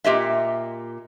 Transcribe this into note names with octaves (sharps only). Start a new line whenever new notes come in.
A#2 G4 D#5 E5